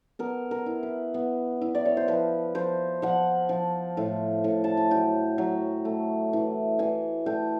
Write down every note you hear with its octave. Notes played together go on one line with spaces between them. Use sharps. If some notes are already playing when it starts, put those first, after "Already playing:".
B3 A#4
A#4
E4
B4
B3
E4
D5
C#5
C5
F3 B4
F3 C5
F3 F#5
F3
A2
A2
A5
G#5
F#3 G5
F#3
A3
E3
E3 G#5
A3 G5